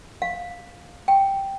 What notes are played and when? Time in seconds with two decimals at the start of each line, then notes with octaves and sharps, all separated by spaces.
0.22 F5
1.08 G5